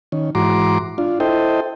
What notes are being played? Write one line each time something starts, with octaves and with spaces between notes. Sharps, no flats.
D#3 C#4
G#2 E3 F#4 A#5 C6 D6
D4 F4
E4 A4 C5 D#5 G5